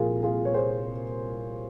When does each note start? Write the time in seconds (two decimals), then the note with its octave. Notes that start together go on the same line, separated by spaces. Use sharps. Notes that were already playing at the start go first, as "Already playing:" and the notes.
Already playing: C2 A#2 F3 F4 G#4 A#4
0.23 F4 G#4
0.45 C#5
0.54 G#4 C5